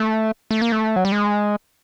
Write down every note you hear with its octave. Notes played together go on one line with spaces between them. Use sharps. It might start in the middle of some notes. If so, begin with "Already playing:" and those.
Already playing: A3
A3
A#3
A3
F#3
G3
G#3